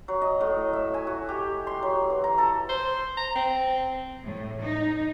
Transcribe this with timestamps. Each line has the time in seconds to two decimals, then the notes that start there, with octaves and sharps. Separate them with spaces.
0.08 F#3
0.22 D#5
0.41 A2
0.73 E5
0.94 G#5
1.07 F#4
1.29 G4
1.67 C6
1.83 F#3
2.10 E3
2.24 A#5
2.38 A4
2.69 C5
3.17 A#5
3.36 C4
4.24 A2
4.61 D#4